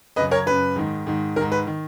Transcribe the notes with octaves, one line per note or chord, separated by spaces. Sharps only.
F#2 C#3 B4 D#5
A#4 C#5
F#2 C#3 B4
G#2 D#3
G#2 D#3
G#2 D#3 A#4
B4
D#3